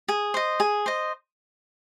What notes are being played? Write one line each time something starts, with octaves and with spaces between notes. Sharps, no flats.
G#4
C5 D#5
G#4
C5 D#5